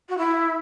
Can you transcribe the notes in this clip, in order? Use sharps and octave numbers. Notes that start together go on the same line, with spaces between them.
F#4
E4